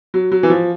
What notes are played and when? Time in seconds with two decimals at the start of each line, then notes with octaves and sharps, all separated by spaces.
0.14 F#3
0.32 F#3
0.43 E3
0.50 F3